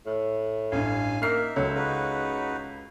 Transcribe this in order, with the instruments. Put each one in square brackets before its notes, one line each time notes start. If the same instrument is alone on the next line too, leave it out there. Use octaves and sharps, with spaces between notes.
[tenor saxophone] A2
[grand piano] A1 G2 [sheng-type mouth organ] F5 G#5
[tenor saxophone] A#3 [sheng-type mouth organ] D#4 E5 [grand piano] F6 C7
[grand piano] C#2 A4 [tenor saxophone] F#3
[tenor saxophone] C#3 [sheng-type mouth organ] D#4 F#4 B4